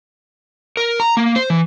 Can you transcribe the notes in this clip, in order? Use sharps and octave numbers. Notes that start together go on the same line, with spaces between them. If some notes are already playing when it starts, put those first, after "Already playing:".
A#4
A#5
A#3
C5
E3